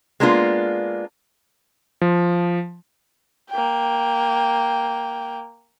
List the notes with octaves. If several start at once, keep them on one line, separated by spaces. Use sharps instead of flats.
G#3 A#3 B3 D4 F4
F3
A#3 G5